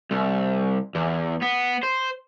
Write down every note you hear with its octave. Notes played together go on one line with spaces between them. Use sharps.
C2
E2
B3
C5